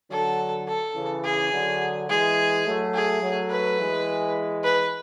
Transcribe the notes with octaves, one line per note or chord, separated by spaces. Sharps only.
D3 F#3 A4
A4
C#3 E3
G#4
D3 F#3
E3 G#3 G#4
F#3 A3
G#4
F#3 A3
B4
E3 G#3
B4